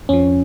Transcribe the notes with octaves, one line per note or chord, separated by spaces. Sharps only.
F2 F3 C#4